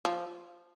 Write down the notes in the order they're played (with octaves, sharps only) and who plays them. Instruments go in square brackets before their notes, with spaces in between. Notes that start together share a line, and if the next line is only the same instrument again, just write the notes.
[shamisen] F3